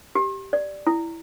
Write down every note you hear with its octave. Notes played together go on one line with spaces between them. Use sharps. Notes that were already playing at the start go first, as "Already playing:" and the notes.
G4
D5
E4